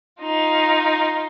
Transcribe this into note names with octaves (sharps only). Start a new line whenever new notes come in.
D#4 F4